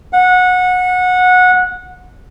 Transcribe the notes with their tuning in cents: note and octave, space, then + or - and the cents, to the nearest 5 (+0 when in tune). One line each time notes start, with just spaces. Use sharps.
F#5 -20